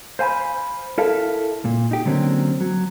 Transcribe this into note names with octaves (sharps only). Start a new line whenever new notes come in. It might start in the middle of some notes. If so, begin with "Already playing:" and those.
C5 F5 G#5 A#5 B5
E4 A4 A#4 E5 F5 A5
A#2
D#4 G4
D3 F#3 A#3 C4 C#4
F#3